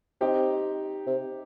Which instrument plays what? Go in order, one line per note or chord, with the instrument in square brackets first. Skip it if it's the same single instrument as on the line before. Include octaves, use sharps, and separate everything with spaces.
[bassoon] C4 [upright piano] D#4 G4
[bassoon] C3